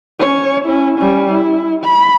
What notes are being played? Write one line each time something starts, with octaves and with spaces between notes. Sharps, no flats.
C#4 C#5
C#4 E4
G3 C#4
E4
B5